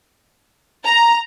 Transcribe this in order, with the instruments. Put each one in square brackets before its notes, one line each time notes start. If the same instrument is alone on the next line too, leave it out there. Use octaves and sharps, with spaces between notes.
[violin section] A#5